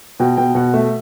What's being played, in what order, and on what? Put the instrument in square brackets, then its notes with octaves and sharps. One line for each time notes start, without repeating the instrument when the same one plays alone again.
[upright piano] B2 G5
B2 G5
B2 F#5
A3 E5